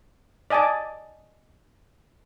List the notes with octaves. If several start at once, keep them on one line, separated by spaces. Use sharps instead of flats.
D5 D#5 G#5 A5 D6